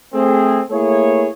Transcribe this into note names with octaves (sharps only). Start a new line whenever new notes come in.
A3 C4 G#4
A3 A#3 E4 G#4 C#5